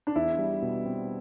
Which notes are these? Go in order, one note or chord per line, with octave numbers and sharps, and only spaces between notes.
D4
E2 E4
G3
B2
C4